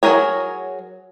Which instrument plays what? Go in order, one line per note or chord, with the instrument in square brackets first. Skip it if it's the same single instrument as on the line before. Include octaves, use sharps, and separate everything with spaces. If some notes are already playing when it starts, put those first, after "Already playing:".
[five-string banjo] F#3 A#3 G#4 A#4 C#5